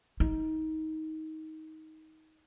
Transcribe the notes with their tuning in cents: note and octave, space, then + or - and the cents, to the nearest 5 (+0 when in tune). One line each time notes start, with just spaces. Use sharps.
D#4 +20